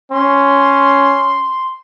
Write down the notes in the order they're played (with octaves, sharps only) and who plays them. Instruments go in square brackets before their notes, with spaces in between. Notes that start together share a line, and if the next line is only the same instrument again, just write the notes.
[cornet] C#4 [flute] C6